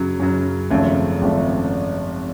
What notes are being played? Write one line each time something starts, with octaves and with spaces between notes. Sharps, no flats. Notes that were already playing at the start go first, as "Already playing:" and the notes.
Already playing: F#2 C#3 F#3
F#2 C#3 F#3
G#1 F#2 C#3 F3 A3
G#1 F#2 C#3 F3 A3